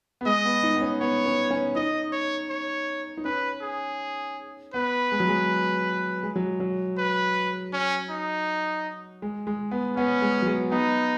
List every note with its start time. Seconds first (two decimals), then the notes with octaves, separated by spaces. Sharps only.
0.21 B3
0.26 G#3 D#5
0.45 B3
0.63 D#4
0.76 B3
0.81 C#4
1.01 B3 C#5
1.26 C#4
1.51 C#4
1.75 D#4 D#5
2.12 C#5
2.50 C#5
3.17 D#4
3.25 C#4 B4
3.62 G#4
4.74 B3 B4
5.12 G#3
5.20 F#3
5.28 G#3
6.23 G#3
6.36 F#3
6.60 F#3
6.98 B4
7.73 C#4
8.10 D#4
9.22 G#3
9.47 G#3
9.71 B3
9.97 B3 C#4
10.22 G#3
10.42 F#3
10.47 G#3
10.72 B3 D#4